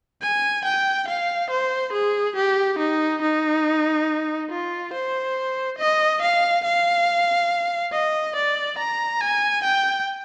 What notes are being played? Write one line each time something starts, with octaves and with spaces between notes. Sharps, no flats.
G#5
G5
F5
C5
G#4
G4
D#4
D#4
F4
C5
D#5
F5
F5
D#5
D5
A#5
G#5
G5